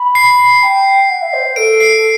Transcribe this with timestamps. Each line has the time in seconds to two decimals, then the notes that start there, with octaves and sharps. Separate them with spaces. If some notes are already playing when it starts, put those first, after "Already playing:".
Already playing: B5
0.15 C7
0.63 G5
1.10 F#5
1.22 E5
1.33 C5
1.44 C5
1.56 A4 D7
1.80 C7